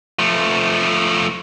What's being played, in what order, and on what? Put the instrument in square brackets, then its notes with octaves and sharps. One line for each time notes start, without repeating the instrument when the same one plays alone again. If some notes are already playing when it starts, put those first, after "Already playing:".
[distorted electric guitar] F3 A3